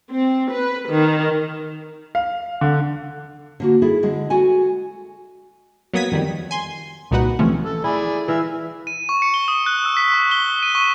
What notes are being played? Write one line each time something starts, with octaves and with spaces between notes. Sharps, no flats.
C4
B4
D#3
F5
D3
D3 A#3 F#4
E4 G#4 A4
D3 G#3
F#4 A4 G#5
F#3 A#3 B3 D#6 G#6 B6
F2 D#3 G3
G#5 C6
C2 A#2 D#4 F#4 B4 F#5
C3 E3 F3 A3 C#4
A4
E4 G#4 D5
E3 E5 F5
D#7
C#6
C#7
G7
D#6
F#6
E6
B6
C#6
G7
D#7
C#6